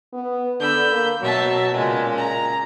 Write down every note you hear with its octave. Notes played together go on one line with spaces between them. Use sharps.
B3
D3 B5 E6 G6
A#3
B2 F#3 E5 A5
A#2 C#3 G#3
A#5